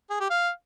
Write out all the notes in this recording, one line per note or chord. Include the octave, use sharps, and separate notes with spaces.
G#4
G4
F5